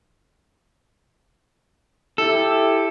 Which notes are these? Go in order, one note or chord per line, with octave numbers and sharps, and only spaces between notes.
E4 G4 A4